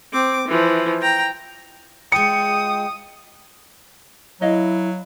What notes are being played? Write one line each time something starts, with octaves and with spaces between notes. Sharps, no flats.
C4 D6
E3 F3
G5 A#5
G#3 F4 G5 D#6 C#7
F#3 E4 C#5 D#5 F5